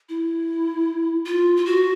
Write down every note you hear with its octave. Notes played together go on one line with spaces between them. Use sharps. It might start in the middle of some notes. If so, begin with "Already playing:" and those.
E4
F4
F4
F#4